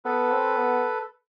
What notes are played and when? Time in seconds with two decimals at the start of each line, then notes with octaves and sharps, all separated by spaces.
0.05 B3 A4 B4
0.31 C4
0.56 B3